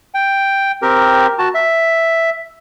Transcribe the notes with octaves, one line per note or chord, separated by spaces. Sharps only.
G5
C4 G4 A#4
F#4 A5
E5